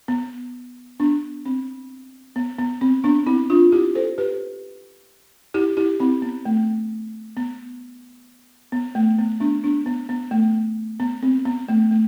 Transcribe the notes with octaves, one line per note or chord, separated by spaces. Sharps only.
B3
B3 D4
C4
B3
B3
C4
B3 D4
C4 E4
D4 F4
E4 G4
A4 C5
G4 B4
E4 G4
E4 G4
C4 E4
B3
A3
B3
B3
A3
B3
B3 D4
B3 D4
B3
B3
A3
B3
C4
B3
A3
A3